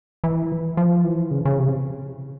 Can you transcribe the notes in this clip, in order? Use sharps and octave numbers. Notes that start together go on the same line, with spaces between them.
E3
F3
E3
C#3
C#3
C3